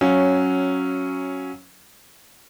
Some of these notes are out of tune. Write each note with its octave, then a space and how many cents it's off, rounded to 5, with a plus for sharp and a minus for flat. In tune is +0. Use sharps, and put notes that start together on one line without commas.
F#3 +0 C#4 -5 F5 +0